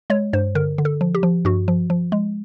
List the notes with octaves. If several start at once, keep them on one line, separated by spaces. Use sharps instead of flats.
G#3 C#5
G2 C5
D3 A#4
D3
A4
F3
G4
F3
G2 F#4
F3
F3
G#3